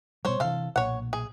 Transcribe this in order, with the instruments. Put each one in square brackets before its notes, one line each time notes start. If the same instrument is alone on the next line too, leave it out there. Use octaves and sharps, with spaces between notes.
[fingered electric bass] B2 G3 [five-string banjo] C5 C#5
[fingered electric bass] C3 E3 [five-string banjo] A4 F5
[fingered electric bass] B1 A#2 [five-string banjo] C#5 F#5
[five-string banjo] G#4